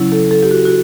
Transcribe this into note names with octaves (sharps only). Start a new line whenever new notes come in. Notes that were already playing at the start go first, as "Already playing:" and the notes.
Already playing: C#3 F#3 C#4 E4
A4
A4
G4
F#4
F#4